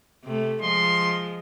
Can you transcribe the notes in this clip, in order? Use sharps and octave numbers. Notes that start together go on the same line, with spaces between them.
C3 A3
F3 G#3 C6